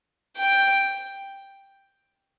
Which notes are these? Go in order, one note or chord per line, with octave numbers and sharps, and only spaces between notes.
G5